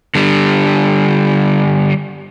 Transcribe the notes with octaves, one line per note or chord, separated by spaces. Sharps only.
D3 G3